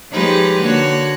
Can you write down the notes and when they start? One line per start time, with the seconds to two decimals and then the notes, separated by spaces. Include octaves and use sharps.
0.12 F3 G#3 D#4 G4 B4 C#5
0.63 D3 A#3 F#4 C#5